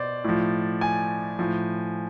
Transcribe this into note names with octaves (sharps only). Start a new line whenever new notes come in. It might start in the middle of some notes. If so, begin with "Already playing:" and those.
Already playing: B2 C5 D5
A2 F3
G#5
A2 F3